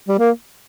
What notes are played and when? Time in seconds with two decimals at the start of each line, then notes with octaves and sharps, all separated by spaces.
0.08 G3
0.19 A#3